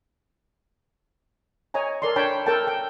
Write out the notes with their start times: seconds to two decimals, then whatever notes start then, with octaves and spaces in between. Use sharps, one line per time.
1.74 C#5 D#5 G#5 A#5
2.02 A4 A#4 D5 A#5 C6
2.16 D4 C#5 G5 A5 B5
2.46 A4 A#4 G5 A5
2.67 G5